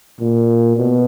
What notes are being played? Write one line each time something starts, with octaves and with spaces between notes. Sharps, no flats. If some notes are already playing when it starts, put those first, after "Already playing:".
A#2
B2